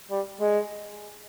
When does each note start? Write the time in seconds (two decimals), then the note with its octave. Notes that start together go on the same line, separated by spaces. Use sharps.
0.11 G3
0.41 G#3